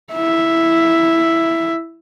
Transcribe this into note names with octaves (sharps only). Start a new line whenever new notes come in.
E4 E5